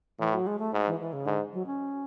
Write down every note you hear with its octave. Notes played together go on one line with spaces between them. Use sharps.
A2 E3
F#3
G#3
A3
G#2
E3
E3
C#3
G#2 D3
F#3
C#4